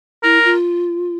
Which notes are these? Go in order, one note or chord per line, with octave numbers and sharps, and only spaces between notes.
E4 A#4
F4